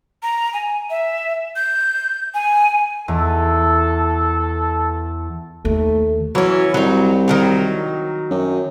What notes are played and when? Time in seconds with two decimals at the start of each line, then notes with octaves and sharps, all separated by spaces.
0.23 A#5
0.53 G#5
0.90 E5
1.56 G6
2.34 G#5
3.08 E2 A4
5.65 D#2 A3
6.35 E3 F#3 C#4
6.74 C2 F#3 D#4
7.28 D#3 F#3 D#4
8.30 F#2